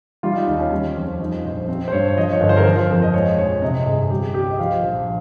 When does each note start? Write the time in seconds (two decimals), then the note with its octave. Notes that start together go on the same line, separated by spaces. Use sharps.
0.23 G3 F4
0.36 D#4
0.47 D#2 D#4
0.60 C#4
0.72 G3
0.96 F2
1.20 F3 D#4
1.45 A#1 C5
1.68 C4 C5
1.88 C5
1.92 G2 C#5
2.08 C#5
2.16 F3 D#5
2.32 C#5
2.41 G1
2.49 C5
2.57 A#4
2.64 F3 C5
2.90 F2
3.02 D#5
3.14 G#3 C#5
3.38 A#1 C#5
3.62 C3 D#5
3.86 G1 G#4
4.02 G#4
4.10 G3 G4
4.34 C2 G4
4.50 D#5
4.59 F3 F5
4.84 A#1